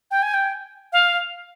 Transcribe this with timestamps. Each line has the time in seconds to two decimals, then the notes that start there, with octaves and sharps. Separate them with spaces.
0.11 G5
0.22 G#5
0.34 G5
0.93 F5